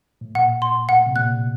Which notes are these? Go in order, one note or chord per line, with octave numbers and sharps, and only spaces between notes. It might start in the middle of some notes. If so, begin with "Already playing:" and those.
A2
A#2 F#5
C6
A2 F#5
C3
A#2 F#6